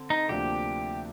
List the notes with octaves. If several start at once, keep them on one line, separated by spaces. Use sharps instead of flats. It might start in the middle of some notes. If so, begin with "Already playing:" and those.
Already playing: D3 C4
D#4
D2 C3 F3 A#3 D4 G4